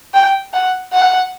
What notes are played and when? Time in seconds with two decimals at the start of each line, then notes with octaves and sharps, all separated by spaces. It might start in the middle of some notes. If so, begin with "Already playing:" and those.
0.14 G5
0.54 F#5
0.93 F#5